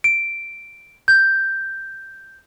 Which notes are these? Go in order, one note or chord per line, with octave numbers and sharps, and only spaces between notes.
D7
G6